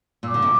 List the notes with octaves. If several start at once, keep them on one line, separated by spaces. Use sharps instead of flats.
A#2 D6 E6
D3
C3